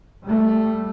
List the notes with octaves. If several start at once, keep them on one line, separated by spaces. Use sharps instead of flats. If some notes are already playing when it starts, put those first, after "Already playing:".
G3 A3